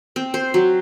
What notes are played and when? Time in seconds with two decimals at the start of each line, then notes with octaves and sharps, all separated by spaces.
0.16 C4
0.34 C5
0.54 F#3